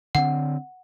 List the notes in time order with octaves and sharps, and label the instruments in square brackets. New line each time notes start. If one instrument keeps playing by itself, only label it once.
[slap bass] D3 C4 [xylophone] F#5